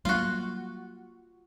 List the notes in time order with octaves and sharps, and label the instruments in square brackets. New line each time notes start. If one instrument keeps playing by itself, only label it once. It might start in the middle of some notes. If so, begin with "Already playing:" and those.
[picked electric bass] F#3 G3 A#3 [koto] F4 F#4